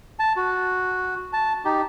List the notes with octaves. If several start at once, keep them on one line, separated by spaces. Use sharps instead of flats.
A5
F#4
A5
D#4 G4